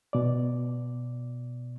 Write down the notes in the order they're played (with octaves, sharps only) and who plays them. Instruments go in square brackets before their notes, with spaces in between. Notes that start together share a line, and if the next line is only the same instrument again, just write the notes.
[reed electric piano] B2 D5